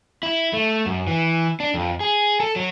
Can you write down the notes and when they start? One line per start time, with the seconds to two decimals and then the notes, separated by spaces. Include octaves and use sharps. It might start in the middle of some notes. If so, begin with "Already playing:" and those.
0.23 E4
0.53 A3
0.86 F#2
1.07 E3
1.60 D4
1.74 F2
2.00 G#4
2.40 A4
2.56 F#3